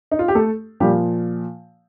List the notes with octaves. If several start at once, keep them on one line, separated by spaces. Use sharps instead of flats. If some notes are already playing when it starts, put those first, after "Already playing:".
D#4
F4
G4
A3 A4
A#2 F3 G3 G4